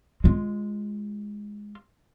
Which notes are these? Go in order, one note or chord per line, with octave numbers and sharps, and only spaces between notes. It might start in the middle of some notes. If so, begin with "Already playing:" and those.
G#3 F4